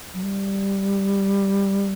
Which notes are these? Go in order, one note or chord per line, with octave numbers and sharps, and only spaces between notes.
F#3
G3